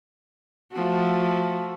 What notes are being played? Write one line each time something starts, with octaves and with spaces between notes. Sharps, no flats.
F3 A3 F#4